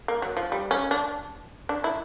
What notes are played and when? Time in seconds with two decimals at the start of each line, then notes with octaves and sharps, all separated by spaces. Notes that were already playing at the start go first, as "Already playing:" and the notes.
0.08 A#3
0.22 F#3
0.37 F3
0.52 G3
0.71 C#4
0.91 D4
1.69 D4
1.84 E4